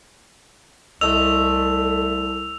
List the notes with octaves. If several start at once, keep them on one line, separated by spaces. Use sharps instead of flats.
C2 A3 D#5 E6 F7